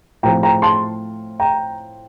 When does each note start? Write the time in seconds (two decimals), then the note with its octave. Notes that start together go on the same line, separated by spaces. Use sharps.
0.23 A2 F3 C4 G5 A#5
0.43 G5 A#5
0.62 A5 C6
1.40 G5 A#5